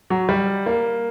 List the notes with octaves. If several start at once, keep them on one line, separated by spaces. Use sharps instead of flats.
F#3
G3
A#3